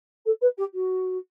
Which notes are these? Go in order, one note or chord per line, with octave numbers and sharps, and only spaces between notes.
A4
B4
G4
F#4